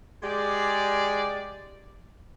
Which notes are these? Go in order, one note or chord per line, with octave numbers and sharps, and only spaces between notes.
G#3 G4 D5